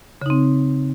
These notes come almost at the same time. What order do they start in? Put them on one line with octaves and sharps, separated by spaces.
C#3 D#4 C4